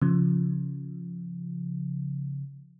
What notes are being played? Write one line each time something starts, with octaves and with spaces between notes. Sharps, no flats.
C#3 F3